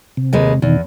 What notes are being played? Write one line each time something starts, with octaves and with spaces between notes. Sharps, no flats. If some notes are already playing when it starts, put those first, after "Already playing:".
C3
D#2 G#3 B4
E2 B2 D#3